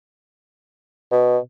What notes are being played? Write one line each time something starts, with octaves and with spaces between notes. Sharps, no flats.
B2